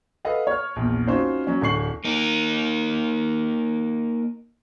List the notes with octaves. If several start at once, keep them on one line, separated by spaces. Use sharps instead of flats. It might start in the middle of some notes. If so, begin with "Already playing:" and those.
A4 B4 D#5 F5 F#5
C#5 F6
A#1 E2
C4 C#4 D#4 F4 F#4 C5
F#3 C#4
D1 D3 D4 C#6 C7 F#7
A#3 D#4